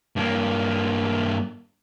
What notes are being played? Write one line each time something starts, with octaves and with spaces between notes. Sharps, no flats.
G2 A#3